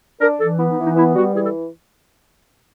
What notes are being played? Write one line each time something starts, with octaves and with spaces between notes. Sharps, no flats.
D4 A#4
E3 A4
B3 E4
D#4
E3
D#4
B3 E4
G3 F#4
E3 G#4
A4